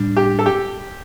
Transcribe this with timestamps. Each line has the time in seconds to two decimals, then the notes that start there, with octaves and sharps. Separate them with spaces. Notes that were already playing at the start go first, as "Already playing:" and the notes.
Already playing: A2 G3 D4
0.17 G4
0.39 A4
0.46 G4